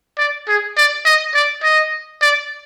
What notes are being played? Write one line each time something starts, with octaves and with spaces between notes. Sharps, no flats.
D5
G#4
D5
D#5
D5
D#5
D5